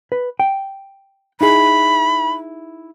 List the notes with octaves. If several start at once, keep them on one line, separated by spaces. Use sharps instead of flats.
B4
G5
D#4 E4 G#4 B5